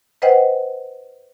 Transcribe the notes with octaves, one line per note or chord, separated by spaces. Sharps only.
B4 C5 D#5 F#5 G5